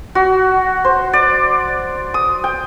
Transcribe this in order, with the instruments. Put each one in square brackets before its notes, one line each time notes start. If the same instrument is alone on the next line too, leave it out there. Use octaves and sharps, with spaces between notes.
[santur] F#4
C5
D5
D#6
G5